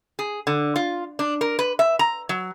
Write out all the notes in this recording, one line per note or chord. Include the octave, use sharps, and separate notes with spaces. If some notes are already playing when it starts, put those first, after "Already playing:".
G#4
D3
F4
D4
A#4
B4
E5
A#5
F#3